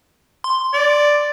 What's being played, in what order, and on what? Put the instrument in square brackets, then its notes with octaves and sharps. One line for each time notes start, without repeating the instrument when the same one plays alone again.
[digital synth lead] C6
[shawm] D5